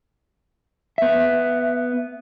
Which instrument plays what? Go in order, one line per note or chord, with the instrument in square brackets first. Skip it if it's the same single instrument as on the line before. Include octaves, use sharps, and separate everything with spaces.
[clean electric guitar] B3 E5